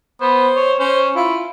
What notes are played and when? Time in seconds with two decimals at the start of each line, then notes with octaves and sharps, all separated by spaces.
0.21 B3 C5
0.56 C#5
0.79 C#4 C5
1.16 E4 F4